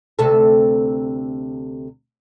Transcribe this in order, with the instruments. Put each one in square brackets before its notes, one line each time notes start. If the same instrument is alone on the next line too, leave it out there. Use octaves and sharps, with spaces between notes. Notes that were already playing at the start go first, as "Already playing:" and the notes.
[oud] D2 C3 A4